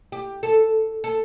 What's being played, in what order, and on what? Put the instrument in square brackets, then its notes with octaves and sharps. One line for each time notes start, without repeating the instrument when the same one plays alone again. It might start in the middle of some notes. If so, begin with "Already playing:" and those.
[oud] G4
A4
A4